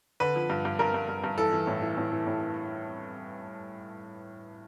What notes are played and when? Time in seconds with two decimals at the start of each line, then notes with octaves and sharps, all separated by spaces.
0.20 D3 B4
0.36 F3
0.50 G2
0.65 G2
0.79 G2 A#4
0.94 G2
1.09 G2
1.24 G2
1.38 E3 A4
1.53 E3
1.67 A2
1.82 E3
1.97 A2
2.12 E3
2.27 A2